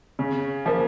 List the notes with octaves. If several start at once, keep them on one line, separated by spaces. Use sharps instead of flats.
C#3
F3 A#3